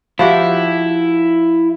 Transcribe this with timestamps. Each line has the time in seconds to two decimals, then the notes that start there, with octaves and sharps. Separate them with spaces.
0.19 F3 E4 F#4 G4